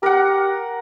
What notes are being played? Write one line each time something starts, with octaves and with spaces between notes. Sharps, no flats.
G4 A#4 F#5